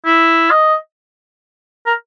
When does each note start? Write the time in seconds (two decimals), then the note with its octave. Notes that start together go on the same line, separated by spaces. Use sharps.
0.06 E4
0.51 D#5
1.86 A#4